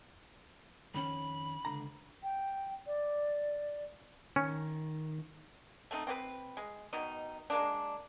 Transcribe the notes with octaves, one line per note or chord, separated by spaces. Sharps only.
F2 D#3 C#4 B5
C#2 D3 A#5
G5
D5
D#3 C#4
A3 C4 D#4
C4 G4 B4
G#3
B2 D#3 D#4
G#3 A#3 D4